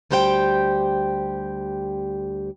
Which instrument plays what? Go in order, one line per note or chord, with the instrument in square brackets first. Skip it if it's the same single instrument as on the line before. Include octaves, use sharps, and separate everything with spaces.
[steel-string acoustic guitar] D2 G3 G4 C5 F#5 G5